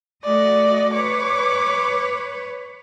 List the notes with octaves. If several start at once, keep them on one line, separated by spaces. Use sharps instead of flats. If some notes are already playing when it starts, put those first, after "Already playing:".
A3 F#4 D5 D#5
B4 C#5 D6